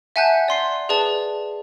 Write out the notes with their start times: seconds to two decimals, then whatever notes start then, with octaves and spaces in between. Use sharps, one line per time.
0.16 E5 F#5 G#5 A5 F#6 G6
0.48 D5 C6 C7
0.89 G#4 B4 D5 A5